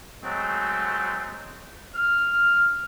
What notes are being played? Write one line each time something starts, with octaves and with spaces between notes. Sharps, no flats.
F#3 G#3 A3 C4
F6